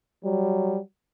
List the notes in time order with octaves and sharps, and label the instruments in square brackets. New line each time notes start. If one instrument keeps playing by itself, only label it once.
[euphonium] F#3 [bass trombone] G3